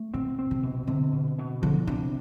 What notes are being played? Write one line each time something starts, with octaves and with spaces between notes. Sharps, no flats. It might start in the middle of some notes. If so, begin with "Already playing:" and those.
Already playing: A3
B2 C4
C4
C3
B2
D3 C4
B2
B2
D3 F3
C3 D4